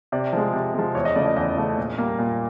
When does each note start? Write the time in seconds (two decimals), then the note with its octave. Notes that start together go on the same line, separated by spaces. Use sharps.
0.12 C3 D5
0.33 F3 G#3
0.53 C3
0.75 F3 G#3
0.95 E2 C#5
1.05 D#5
1.15 C#3 F3 A3 D5
1.26 D#5
1.36 E2 D#5
1.57 C#3 F3 A3
1.78 A#2
1.98 G3 A#3
2.19 A#2